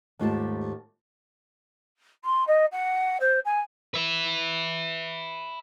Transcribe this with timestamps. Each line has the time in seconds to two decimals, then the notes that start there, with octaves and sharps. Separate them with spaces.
0.19 D#2 G#2 A3 F4 G4 A5
2.24 C6
2.47 D#5
2.72 F#5
3.20 C5
3.45 G#5
3.94 B4 E5